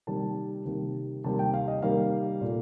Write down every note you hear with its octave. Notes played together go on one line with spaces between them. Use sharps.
C3 D#3 G3 A#3 A5
C3 D#3 G3 A#3
C3 D#3 G3 A#3 A5
G5
F5
D#5
C3 D#3 G3 A#3 F5
A#2 A3